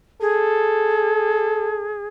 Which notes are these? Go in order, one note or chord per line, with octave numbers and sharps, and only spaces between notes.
G#4 A4